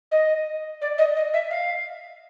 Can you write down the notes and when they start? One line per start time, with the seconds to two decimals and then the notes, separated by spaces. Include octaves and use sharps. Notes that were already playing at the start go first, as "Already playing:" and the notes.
0.11 D#5
0.81 D5
0.98 D#5
1.16 D#5
1.33 E5
1.50 F5